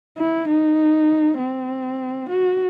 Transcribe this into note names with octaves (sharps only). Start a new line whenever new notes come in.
E4
D#4
C4
F#4